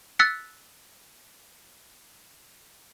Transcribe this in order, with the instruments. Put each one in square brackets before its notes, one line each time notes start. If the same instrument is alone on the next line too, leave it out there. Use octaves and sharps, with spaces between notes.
[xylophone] E6 F#6 A6 B6 C#7